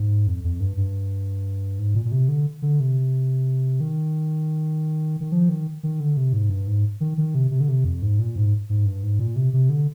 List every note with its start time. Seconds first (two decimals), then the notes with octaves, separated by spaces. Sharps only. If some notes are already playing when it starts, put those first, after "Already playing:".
Already playing: G#2
0.27 F2
0.44 F2
0.60 G2
0.77 G2
1.79 G#2
1.95 A#2
2.05 A#2
2.12 C3
2.29 D3
2.62 D3
2.80 C3
3.80 D#3
5.20 D#3
5.32 F3
5.49 D#3
5.83 D#3
6.00 D3
6.17 C3
6.33 G#2
6.50 G2
6.67 G#2
7.00 D#3
7.18 D#3
7.35 C3
7.51 C3
7.60 D3
7.68 C3
7.84 F2
8.02 G#2
8.19 A#2
8.36 G#2
8.70 G#2
8.85 G2
9.03 G#2
9.19 A#2
9.36 C3
9.53 C3
9.69 D3